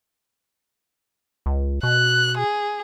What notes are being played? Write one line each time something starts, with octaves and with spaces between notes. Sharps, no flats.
C#2
B2 F#6
G#4